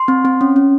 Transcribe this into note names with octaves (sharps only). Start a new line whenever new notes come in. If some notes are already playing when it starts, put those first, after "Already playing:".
Already playing: C6
C4
C4
C#4
C#4